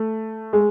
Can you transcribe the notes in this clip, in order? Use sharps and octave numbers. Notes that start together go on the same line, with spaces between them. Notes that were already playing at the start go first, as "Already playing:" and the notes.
Already playing: A3
G#3